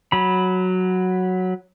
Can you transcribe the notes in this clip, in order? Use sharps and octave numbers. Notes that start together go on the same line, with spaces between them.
F#3 B5